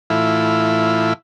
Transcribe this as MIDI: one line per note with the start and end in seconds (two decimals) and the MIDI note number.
0.10 1.13 45
0.10 1.13 52
0.10 1.13 64
0.10 1.13 65